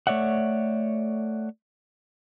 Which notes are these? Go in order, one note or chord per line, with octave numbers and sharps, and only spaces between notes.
A3 C#5 D5 E5 F#5